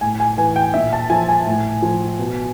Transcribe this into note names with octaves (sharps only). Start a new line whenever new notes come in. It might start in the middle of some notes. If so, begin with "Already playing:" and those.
A2 G#5
G#5
E3 G#5
G5
A#2 E5
A5
F3 G#5
G#5
A2
F3
B2